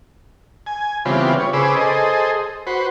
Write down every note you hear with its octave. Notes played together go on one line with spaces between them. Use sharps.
G#5
C#3 E3 G3 B3 C4 F4
C#5
C#3 G#4 B4 C5 D6 E6
G#4 A4 C5 D#5
F#4 B4 C5